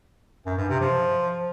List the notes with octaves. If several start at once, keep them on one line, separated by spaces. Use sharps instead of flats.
F#2
G2
C3
F3